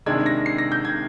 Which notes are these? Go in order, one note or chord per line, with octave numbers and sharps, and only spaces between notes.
C3 D#3 G#3 D4 G#6
A#6
C7
A#6
G6
G#6